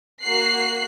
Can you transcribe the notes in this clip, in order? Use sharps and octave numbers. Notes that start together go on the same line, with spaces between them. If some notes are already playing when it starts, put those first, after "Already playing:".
A#3 F#4 F#6 C7